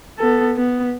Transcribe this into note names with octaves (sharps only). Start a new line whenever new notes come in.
B3 A4
B3